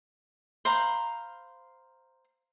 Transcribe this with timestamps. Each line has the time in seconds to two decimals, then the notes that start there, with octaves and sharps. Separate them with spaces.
0.65 C5 F5 A#5 B5